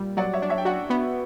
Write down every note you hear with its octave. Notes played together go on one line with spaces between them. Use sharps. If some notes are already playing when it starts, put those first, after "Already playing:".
Already playing: A#2 G3
F#3 D5 F#5
C#5 E5
D4
C#5 E5
G5
F#4 D5 F#5
B3